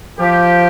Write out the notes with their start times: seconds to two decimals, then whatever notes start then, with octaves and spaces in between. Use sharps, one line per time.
0.19 F3 G4